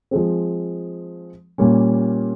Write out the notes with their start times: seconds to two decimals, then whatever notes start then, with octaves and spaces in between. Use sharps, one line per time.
0.11 F3 G#3 C4
1.58 A#2 G3 A#3 C#4